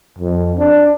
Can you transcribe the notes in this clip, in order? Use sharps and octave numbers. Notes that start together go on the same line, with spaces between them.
F2
D4